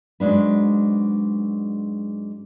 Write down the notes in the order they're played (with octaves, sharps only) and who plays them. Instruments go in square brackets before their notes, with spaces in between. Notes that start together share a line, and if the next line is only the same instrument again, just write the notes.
[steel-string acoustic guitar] G#2 F#3 G#3 D4 B4